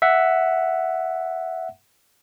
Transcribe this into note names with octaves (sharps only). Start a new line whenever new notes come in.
E5 F#5